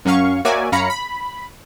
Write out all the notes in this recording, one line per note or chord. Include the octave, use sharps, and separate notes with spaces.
F#2 F#3 C#4 F5 C#6
A#3 F#4 C#5 D5 E5 G#5
F#2 C#4 F5 A#5 B5 C#7
B5